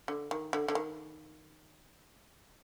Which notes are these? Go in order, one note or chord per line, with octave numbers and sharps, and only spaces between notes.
D3
D#3
D3
D3
D#3